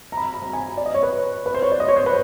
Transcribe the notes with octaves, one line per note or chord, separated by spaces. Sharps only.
A#5
B5
B5
A#5
G#5
D5
D#5
C#5
B4
B4
C5
C#5
D5
D#5
C#5
C5
B4